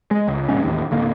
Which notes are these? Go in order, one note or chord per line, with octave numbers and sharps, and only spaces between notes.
G#3
C#2
F1 A#1 G#2 C#4
A1 D#2
D1 D3 A#3